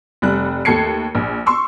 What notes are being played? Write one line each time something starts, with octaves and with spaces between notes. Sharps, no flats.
F1 G3 F#6
D#2 A3 A5 G#6 C7 C#7
A#1
C6 C#6 E6